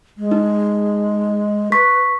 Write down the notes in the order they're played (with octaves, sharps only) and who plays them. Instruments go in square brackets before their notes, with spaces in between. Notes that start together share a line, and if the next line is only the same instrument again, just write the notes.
[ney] G#3
[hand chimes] D#4
[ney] B4 [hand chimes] C#6 B6